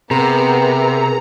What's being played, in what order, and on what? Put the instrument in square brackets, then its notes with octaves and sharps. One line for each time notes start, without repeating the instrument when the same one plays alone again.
[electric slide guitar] C3 [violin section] B3 [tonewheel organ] G#4 A#4 [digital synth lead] A#5